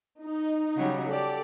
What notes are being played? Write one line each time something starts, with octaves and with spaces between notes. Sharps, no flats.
D#4
C#3 F#3 G3
G4 A4 D5